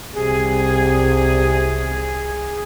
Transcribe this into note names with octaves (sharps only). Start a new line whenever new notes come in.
C2 C3 G#4